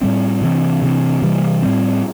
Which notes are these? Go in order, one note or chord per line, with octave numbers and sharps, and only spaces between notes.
A2 G3 C4
C3 E3 C4
C3 E3 C4
C3 E3 G3
A2 G3 C4